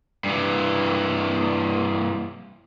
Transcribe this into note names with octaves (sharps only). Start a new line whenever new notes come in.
G2 E3